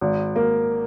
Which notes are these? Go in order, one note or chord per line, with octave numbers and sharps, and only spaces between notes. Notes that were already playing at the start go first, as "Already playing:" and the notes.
G#1
A#3